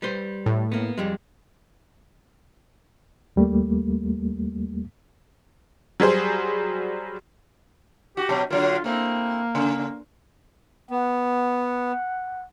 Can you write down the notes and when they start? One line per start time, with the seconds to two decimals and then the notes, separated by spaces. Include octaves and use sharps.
0.02 G3 B4 C5
0.46 A2
0.72 A#3 B3
0.98 F2 G3 G#3
3.36 D#2 G3 A3 A#3
6.00 F#3 G3 G#4 C5
8.17 F#4 G4
8.29 B2 F#3
8.51 D3 F#3 A#3 F4
8.84 A3 A#3 C4 E4
9.55 C#3
10.91 B3 F#5